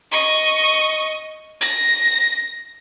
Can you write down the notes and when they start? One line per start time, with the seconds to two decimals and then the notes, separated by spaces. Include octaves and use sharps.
0.11 D#5 C#6
1.61 A#6